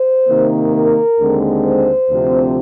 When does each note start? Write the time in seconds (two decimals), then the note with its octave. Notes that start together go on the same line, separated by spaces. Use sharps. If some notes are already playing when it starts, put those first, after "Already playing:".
Already playing: C5
0.29 C3 D#3 A#3
0.74 A#4
1.19 D#2 D3 G#3 C4
1.65 C5
2.10 D2 C3 F3 C4